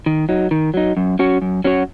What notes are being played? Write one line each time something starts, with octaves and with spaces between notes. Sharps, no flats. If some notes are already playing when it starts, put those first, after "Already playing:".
D#3
F#3 D#4
D#3
F#3 D#4
F#2
F#3 C#4 F#4 C#5
F#2
F#3 C#4 F#4 C#5